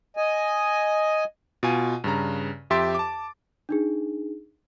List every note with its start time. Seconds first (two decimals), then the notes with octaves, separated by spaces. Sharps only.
0.17 D#5 G#5
1.63 B2 F4 G#5 D#7
2.04 G2 C#3 A#5
2.70 F2 G4 E5 C6 A6 D7
2.95 A5 D6
3.69 D4 D#4 G#4